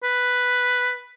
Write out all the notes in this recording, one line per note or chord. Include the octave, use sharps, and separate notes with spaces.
B4